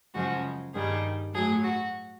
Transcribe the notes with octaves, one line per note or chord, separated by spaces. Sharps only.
F#2 C#3 F3 G#3 F#4
G2 D#3 G3 G#4
A2 F#3 G#4
F#4